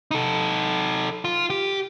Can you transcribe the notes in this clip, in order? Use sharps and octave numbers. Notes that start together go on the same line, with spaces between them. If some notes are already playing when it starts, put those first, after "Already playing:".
D#4 A4
F4
G4